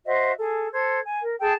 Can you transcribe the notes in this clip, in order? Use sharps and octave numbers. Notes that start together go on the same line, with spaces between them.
F#4 C5 D#5 E5
G#4 A4
A4 C5 G#6
G#5
A#4
G#4 A4 G5 A5